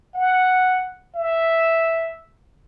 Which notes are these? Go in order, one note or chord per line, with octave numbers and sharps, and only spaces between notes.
F#5
E5